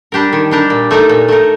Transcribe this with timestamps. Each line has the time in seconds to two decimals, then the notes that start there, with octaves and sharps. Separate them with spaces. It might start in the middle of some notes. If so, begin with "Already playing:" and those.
0.12 G3 D4 G4 A#4
0.33 D#3
0.51 G3 D4 G4 A#4
0.70 A#2
0.91 A3 D#4 A#4
1.09 A#2
1.28 A3 D#4 A#4